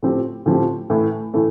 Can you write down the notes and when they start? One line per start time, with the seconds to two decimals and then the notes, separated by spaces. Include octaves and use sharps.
0.03 A2 F3 C4 G4
0.46 A2 F3 C4 G4
0.90 A2 E3 A3
1.34 A2 E3 A3